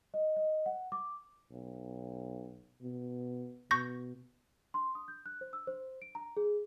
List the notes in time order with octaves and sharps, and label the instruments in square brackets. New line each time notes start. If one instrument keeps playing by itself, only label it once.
[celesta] D#5
D#5
F#5
D6
[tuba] B1
B2
[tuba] B2 [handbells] C#6 G6 A#6
[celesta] C6
D#6
G6
F#6
C5
E6
C5
D7
A#5
G#4